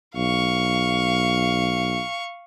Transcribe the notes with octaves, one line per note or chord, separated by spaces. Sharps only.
B1 F5 C#6